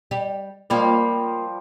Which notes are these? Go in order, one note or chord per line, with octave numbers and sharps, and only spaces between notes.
G3 G4
F3 G3 A#3 F4 C#5